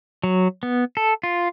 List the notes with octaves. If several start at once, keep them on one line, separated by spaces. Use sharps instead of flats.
F#3
B3
A4
F4